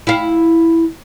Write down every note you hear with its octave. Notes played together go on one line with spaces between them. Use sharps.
E4 F5